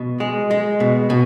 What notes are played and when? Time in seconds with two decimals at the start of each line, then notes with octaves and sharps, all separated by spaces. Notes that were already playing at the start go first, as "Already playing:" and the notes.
Already playing: B2
0.20 G#3
0.51 G#3
0.80 B2
1.10 B2